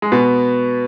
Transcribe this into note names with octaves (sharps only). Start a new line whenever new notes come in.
G#3
B2 B3